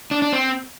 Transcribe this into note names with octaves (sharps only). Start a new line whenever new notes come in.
D4
D4
C4